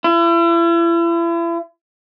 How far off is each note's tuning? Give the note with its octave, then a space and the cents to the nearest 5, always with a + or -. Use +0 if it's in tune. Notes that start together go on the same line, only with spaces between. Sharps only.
E4 +40